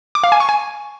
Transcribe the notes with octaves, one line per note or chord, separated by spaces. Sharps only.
D6
F5
G#5
C#6
G#5